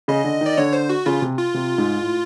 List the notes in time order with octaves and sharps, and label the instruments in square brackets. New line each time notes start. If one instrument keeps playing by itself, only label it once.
[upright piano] C#3 [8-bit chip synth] D#5
[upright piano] D3
[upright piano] D#3 [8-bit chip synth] D5
[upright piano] D3 [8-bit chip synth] C#5
[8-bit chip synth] C5
F#4
[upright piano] C#3 [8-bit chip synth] F4
[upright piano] C3
[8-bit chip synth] F4
[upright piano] C3
G#2
A2